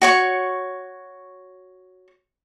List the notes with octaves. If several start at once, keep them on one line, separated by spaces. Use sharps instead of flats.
F#4 C#5 C#6